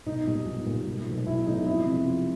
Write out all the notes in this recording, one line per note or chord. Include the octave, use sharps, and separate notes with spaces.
B1 D#4
A#2 G3
B1
A#2 G3
B1
B2 F#3 A3
B1 E4
B2 F#3 A3 D#4
F2 E4
C3 F3 G#3
F2 F4